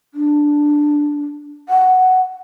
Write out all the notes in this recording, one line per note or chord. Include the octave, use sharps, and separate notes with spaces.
D4
F#5